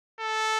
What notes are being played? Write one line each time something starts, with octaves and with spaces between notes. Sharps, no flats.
A4